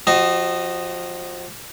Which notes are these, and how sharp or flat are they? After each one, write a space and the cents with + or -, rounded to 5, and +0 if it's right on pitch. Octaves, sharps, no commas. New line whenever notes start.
F3 +15 F#4 +45 D#5 -10